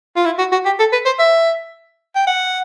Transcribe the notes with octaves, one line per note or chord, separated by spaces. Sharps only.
F4
E4
F#4
F#4
G4
A4
B4
C5
E5
G5
F#5